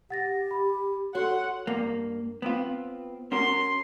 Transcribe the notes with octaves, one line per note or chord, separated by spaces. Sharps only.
G4 F#5 A6 A#6
B5
F#4 A4 C#5 F#5 C6
G2 A#3
B3 C4 F4
C#4 F#4 A#4 C6